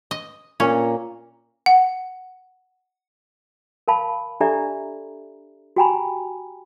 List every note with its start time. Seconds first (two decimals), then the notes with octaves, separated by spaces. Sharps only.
0.11 D#5
0.60 A#2 C#4 A#5
1.66 F#5
3.88 A#4 F5 A5 B5
4.40 D4 G4 A4 D5 E5 A#5
5.76 F#4 G4 G5 G#5 A#5 B5